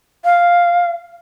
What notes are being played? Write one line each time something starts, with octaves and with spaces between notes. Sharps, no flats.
F5